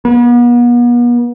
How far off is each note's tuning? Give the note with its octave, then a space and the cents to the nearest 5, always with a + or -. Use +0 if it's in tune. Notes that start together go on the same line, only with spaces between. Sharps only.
B3 -40